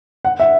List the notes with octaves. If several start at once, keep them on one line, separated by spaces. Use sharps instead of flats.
F#5
E5